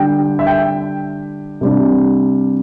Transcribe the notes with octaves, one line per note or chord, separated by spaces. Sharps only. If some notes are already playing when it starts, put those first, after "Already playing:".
Already playing: D3 G3 D4 G5
E5
G5
C3 G3 D4